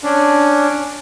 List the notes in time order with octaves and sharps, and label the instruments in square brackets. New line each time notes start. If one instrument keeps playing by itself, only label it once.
[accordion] C#4 D4